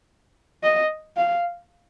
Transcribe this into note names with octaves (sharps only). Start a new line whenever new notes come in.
D#5
F5